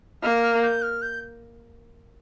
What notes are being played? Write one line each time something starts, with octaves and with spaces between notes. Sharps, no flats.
A#3 F6
F6
G6
F6
G6